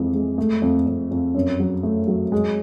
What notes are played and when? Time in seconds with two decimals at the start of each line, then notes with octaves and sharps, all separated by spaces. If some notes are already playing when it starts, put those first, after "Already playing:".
Already playing: F2 E3 G#3
0.14 G#3
0.38 A3
0.62 F2
0.86 F2
1.11 F2
1.34 F#2
1.60 F#3
1.83 A3
2.08 F#3
2.32 G#3